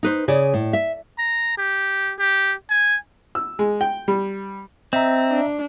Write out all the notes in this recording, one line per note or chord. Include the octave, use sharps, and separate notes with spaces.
D#4 B4 C5
C#3 G#4 D5
A2
E5
A#5
G4
G4
G#5
E6
G#3
G5
G3
C4 D#5 E5 A#5
D4